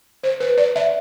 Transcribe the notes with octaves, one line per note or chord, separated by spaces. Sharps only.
C5
B4
D5
E5